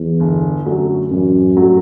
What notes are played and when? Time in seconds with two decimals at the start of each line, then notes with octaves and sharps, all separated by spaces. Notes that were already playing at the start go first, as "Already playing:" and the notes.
Already playing: E2
0.20 G1
0.66 F#2 D3 F#3 A3
1.10 A1 F#2
1.55 G2 F#3 A3